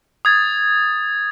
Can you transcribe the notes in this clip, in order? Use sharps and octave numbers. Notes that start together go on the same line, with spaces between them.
D#6 G#6 A6